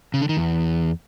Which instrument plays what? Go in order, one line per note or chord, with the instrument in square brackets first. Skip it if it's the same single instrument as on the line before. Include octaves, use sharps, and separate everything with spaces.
[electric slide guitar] C#3
D3
D#3
E2